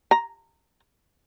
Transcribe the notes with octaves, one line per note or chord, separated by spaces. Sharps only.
A#5